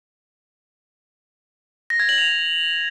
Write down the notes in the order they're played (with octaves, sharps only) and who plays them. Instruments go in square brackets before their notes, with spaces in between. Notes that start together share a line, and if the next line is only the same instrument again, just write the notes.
[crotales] A#6
G#6
F#7
F7